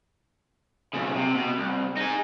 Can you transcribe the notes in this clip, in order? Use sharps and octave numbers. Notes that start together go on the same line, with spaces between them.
B1 C#3
C3
B2
C2
D#4 G#4